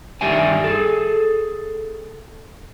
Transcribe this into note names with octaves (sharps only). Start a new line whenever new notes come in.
G2 D#3 G4 D5 E5 G#5
G#4 A4